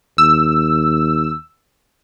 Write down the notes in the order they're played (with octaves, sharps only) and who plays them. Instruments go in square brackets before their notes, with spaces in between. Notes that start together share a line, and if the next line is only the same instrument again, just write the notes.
[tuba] D#2 [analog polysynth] E6